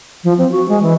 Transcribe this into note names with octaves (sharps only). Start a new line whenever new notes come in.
F3
C4
F#4
G#3
E3